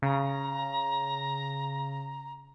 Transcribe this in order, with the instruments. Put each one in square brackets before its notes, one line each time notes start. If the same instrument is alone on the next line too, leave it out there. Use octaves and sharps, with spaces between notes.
[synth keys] C#3 [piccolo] A#5